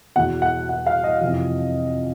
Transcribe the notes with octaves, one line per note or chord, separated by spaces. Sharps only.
E2 B2 F#5
F#5
F#5
F5
D#5
F2 C3 E3